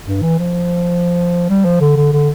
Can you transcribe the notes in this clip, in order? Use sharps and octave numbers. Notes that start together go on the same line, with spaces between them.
G2
E3
F3
G3
F3
D3
D3
D3